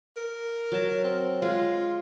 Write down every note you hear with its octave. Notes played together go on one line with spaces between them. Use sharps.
A#4
F#3 A5
C4
G#3 F4